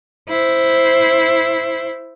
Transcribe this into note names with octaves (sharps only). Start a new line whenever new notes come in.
E4 C5